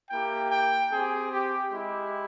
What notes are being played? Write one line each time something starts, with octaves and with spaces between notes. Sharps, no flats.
A#3 E4 G4 G5
G5
C4 G4 G#4
G4
G#3 E4 G4